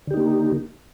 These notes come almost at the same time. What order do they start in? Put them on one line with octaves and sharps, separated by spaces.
D3 G4 D#4 A#3